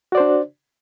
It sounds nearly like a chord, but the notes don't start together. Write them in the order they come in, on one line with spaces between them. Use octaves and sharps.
F#4 D5 C5 D4